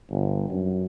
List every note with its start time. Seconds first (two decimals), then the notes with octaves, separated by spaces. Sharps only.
0.11 G1
0.51 F#2